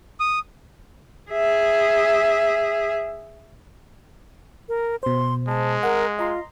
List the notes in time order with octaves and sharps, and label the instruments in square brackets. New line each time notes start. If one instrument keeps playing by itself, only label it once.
[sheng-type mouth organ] D#6
[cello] G#4 E5
[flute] A#4
[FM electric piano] B2 C5 [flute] C6
[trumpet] G#3 [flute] A5
[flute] A#4 [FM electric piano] F#5
[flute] F4 [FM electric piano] D#5 A#5 C6